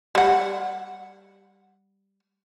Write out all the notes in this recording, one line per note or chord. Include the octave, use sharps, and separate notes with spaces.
G3 F#5